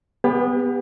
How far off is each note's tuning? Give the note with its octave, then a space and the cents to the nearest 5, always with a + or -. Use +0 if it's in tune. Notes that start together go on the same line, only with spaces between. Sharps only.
B3 +0 G4 +35 B4 -30